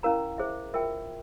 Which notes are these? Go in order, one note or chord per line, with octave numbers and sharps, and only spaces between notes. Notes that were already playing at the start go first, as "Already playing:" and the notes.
C#4 E4 A#4 F5 A#5
G#4 C5 E5
F4 A#4 E5 G5